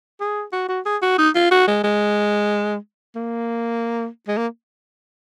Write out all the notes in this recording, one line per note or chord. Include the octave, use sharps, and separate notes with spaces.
G#4
F#4
F#4
G#4
F#4
D#4
F4
F#4
G#3
G#3
A#3
G#3
A#3